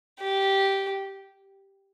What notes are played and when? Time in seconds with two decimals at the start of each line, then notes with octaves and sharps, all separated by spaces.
0.20 G4